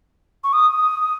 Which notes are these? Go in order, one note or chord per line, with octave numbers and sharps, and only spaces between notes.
C#6
D#6